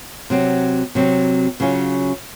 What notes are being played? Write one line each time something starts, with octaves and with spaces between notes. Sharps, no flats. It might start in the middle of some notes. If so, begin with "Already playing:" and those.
C3 F#3 C4
C3 F#3 C4
C#3 F#3 C#4 F4